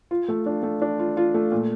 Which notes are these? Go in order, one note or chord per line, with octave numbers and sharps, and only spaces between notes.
F4
A3
D4
A3
D4
F4
F4
A3
A#2